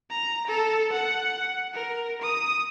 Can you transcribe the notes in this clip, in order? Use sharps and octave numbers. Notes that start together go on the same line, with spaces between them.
A#5
A4
F#5
A#4
D#6